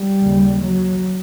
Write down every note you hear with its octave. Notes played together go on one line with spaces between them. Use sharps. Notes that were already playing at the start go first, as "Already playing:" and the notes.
Already playing: G3
D#2 C#3
F#3